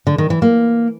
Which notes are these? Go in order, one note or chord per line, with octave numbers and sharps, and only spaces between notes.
D3
D#3
E3
A#3